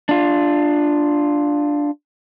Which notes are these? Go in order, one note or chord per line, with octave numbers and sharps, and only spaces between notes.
D4 F4